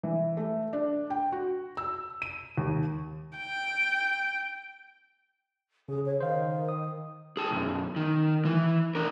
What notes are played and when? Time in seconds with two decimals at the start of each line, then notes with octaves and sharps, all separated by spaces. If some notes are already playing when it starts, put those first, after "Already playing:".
0.03 E3
0.37 A3
0.73 D4
1.10 G5
1.32 F#4
1.77 E6
2.22 D#7
2.58 D#2
3.38 G5
5.89 C#3 G#4
6.05 C#5
6.20 D#3 C5 F5
6.69 D#6
7.37 G#4 A5
7.51 B1 F#2
7.96 D#3
8.45 E3
8.95 D4 A#4